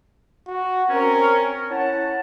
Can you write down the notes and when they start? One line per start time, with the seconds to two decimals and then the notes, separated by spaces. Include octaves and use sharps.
0.47 F#4
0.90 C4 C#4 A#4
1.71 C#4 E4 F#5 A5